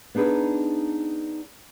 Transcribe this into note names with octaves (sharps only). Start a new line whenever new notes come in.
B3 D4 D#4 G#4 B4